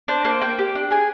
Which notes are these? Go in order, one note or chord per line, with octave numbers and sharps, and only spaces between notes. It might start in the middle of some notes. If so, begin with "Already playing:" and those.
D4 C5
A#3 C5
A#3 G5
G4
D4
G#4 G#5